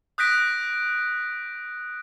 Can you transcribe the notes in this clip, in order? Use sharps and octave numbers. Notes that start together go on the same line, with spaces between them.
D#6 F#6 G6 A#6 B6 D7